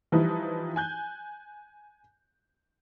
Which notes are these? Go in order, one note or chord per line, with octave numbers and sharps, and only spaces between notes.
E3 F3 G3 D#4 E4 B4
G#5 F#6 G6